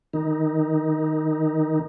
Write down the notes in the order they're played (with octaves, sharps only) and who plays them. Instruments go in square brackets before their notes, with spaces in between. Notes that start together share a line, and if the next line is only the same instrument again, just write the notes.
[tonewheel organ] D#3 D#4